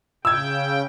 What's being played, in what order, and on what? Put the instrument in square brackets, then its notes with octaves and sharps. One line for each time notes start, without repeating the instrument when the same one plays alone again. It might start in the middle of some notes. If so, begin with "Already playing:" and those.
[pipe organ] C#3 G5 [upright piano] E6 G#6